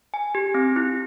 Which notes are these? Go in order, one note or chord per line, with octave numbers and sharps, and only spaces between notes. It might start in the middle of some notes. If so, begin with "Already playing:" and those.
G#5
G4
C4
E4